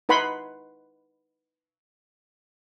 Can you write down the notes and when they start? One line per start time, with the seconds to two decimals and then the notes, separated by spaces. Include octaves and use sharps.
0.09 D#4 B4 F#5 B5 C6